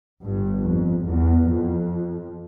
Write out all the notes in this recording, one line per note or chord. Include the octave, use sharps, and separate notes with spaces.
G1 G2
F2
E2
F2